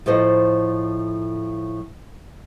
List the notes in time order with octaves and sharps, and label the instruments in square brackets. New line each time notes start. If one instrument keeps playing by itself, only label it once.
[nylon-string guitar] A2 F3 A4 C5 D#5